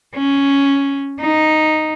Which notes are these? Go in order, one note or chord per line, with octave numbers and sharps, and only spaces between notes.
C#4
D#4